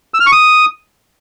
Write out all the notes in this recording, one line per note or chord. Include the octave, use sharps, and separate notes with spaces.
E6
F6
C#6
D#6